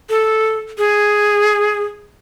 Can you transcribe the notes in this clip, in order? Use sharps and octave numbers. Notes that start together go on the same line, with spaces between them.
A4
G#4